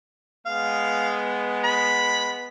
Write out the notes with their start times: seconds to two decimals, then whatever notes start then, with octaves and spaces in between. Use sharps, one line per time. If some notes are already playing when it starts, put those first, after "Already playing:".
0.46 G#3 B3 F5
1.64 B5